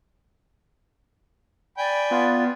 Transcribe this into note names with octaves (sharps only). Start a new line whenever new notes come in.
D5 G5 G#5 B5
B3 F4